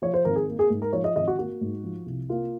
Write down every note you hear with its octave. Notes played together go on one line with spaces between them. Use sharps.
F3 C#5
C5
G#1 A#4
G#4
A#3
G#4
G#2
A#4
F3 C#5
D#5
G#1 D#5
F#4
A#3 F#4
G#2
F3
C2
A#3 F4